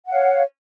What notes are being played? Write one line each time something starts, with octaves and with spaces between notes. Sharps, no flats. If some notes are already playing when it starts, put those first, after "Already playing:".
C#5 F5 F#5